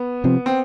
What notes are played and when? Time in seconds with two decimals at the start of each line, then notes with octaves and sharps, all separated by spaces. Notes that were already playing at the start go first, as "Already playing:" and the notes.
Already playing: B3
0.24 C3 F3 C4
0.46 C4